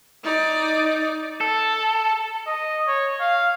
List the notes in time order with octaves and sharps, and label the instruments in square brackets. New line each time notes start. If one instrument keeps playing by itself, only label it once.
[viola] D#4 D5
[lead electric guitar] A4
[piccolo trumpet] D#5
C#5
F5